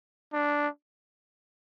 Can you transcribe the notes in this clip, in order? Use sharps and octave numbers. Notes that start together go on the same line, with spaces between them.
D4